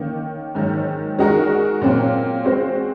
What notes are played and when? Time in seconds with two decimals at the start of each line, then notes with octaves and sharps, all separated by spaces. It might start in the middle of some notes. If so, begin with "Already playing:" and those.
Already playing: D#3 A#3 C#4
0.55 G#2 D#3 F#3
1.19 G#3 D#4 F#4 A#4
1.81 A#2 F#3 C4
2.45 G#3 C4 F#4 C5